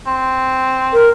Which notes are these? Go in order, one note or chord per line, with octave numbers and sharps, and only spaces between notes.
C4
A#4